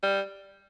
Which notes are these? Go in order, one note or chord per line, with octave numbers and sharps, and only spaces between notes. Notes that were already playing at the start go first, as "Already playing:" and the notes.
G3